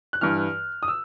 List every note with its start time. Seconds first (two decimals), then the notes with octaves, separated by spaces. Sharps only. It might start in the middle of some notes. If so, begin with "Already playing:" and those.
0.13 F#6
0.21 G2 E3 F6
0.83 D#6
0.88 E6